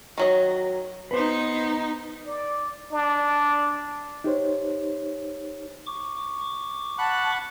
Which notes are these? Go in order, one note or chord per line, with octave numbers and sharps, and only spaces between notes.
D#3 F#3 D#5
B3 D#4 B4 C5
D5
D4
D#4 G4 C5 C#5
C#6 D6
F#5 A5 B5 F#6